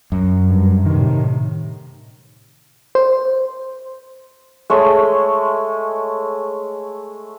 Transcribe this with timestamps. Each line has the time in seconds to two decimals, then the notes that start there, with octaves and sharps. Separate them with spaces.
0.12 F#2
0.45 G2
0.85 A2 C3 D#3
2.95 C5
4.70 G#3 A3 C#5